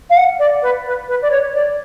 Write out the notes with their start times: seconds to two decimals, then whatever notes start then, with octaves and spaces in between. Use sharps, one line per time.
0.10 F5
0.17 F#5
0.39 D5
0.62 B4
0.85 B4
1.08 B4
1.22 D5
1.31 C#5
1.55 D5